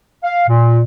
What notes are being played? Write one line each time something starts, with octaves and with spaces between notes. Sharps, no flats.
F5
A#2